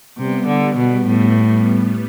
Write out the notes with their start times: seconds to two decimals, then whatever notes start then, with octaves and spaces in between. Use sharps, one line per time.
0.17 C3 G3 B3
0.47 D3
0.76 B2
1.05 A2